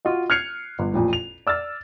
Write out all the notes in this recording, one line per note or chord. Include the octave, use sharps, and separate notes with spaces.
F4 F#4 D#5
F6 F#6 G#6 C7 C#7 F7
G1
A1 F2 A#2
F7
D5 E6 F6 A6